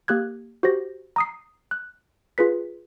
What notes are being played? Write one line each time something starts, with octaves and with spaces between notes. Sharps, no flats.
A#3 G4 F#6 G#6
F#4 G4 C5 A#6
A#5 D#6 C7
F#6
F4 G#4 B4 B6